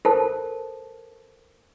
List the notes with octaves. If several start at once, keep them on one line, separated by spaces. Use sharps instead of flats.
A4 A#4 C5 A5